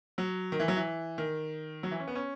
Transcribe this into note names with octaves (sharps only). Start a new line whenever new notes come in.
F#3
D#3
E3
F#3
E3
D#3
F#3
E3
C#4
B3
C#4